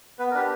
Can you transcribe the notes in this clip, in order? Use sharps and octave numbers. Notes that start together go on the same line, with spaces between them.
B3 B4
A#4
D4 G4 B4